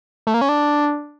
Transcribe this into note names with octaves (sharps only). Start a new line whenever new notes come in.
A3
A#3
C#4
D4